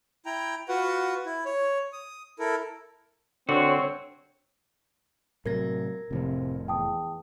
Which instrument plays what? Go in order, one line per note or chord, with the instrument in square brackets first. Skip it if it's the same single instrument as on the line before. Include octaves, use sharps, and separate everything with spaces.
[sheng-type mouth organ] E4 G5 A#5
F4 F#4 B4 F#5
E4
C#5
D#6
E4 A4 A#4
[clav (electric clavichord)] D3 [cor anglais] C4 [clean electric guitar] F#4 [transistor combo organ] C#5
[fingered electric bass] A2 C3 [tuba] F#3 [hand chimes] A#4 G#6 A#6
[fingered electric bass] F1 A2 F3 [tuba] C3
[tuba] E2 [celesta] G5 A5 D#6